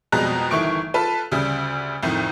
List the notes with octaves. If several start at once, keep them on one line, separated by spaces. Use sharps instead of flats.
F2 B2 G3 G#3 A#5 F#6
G1 D#3 E3 A3 C#6 D7
F4 A4 B4 A5
D2 C#3 G3
C2 F2 A2 D#3